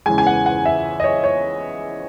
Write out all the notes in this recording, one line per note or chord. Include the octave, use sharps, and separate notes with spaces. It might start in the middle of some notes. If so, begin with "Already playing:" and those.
E2 C#3 E3 G#3 G#5
G#5
F#5
F#5
E5
D#5
C#5
C#5